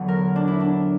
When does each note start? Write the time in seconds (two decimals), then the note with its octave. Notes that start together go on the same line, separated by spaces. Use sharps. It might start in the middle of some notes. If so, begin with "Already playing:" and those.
Already playing: E2 D3 F#3
0.08 A#4
0.36 D4
0.47 E4
0.60 D4